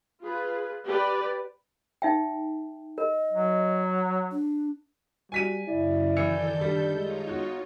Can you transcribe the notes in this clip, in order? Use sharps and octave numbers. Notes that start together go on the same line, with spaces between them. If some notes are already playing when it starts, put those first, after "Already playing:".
F4 G#4 B4
G4 B4 D5
D#4 E5 G5
A#4 D#5
F#3
D4
G3 F#4 G#5 B6 D#7
F#2 C#3 E4 D5
D#3 E3 A4 G6 C#7
D3 G3
G#3 D#4 F4 C#5
B3 F#4